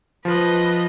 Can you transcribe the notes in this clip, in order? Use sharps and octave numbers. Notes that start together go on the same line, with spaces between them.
F3 B4 D#5